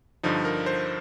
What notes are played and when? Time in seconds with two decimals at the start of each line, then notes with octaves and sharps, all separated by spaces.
0.23 G2 D3 F3 D#4
0.45 A#4
0.66 C5